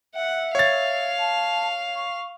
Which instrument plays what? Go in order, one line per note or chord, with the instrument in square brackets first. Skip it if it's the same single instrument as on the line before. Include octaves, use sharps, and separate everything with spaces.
[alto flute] E5 [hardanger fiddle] F#5
[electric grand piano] C#5 A6 [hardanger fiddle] F5
[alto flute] A5
C#6